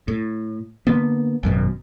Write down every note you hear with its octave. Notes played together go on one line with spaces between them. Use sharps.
A2
D3 A#3 B3
G#1 F#2 B2